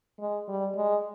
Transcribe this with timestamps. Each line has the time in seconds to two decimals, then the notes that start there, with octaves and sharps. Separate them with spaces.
0.19 G#3
0.48 G3
0.76 G#3